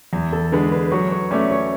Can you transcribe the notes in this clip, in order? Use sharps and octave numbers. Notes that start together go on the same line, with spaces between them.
E2
A4
D3 G#3 B4
B4
F#3 C#5
C#5
A3 C#4 D5
C#5